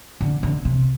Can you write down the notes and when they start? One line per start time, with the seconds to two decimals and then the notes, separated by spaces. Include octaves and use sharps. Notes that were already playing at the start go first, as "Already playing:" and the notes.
0.21 D3
0.43 D3
0.65 C3